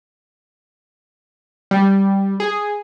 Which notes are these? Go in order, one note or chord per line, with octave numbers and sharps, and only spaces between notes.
G3
G#4